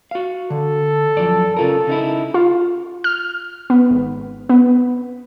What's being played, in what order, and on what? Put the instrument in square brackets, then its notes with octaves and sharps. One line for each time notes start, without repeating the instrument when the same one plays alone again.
[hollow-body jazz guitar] F#4 F5
[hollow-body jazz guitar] D3 [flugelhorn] A4
[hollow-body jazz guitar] F#2 F3 D5
[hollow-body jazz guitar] C#3 F4 A#4 [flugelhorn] A4
[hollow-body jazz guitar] C#3 D#4 E4
[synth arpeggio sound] F4
F6
B3
G#1
B3